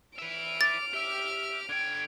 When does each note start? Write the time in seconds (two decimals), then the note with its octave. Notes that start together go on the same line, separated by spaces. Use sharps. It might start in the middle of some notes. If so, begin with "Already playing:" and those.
0.19 B4 E5 F6 D7
0.61 D6 A6
0.94 G4 E5
1.69 D3 G5 G#6